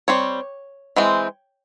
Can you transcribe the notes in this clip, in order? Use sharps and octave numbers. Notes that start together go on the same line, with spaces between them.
G3 C4 C#5
E3 G#3 C4